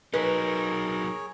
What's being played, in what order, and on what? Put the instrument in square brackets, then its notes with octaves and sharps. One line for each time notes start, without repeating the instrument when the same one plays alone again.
[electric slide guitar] F#3 D#4 [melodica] G#4 C#5 [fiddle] A#4 [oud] B4